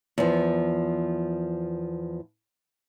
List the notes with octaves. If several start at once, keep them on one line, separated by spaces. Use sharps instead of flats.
E2 F3